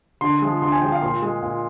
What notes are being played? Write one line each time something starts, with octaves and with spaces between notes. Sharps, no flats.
D3 C6
F3 G#3
D3 C6
G#5
F3 G#3 G5
F5
A#2 C6
G#3
A#2